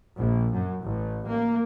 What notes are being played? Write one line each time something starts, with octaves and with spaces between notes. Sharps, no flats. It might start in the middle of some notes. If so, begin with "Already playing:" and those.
A#1
F#2
A1
A#3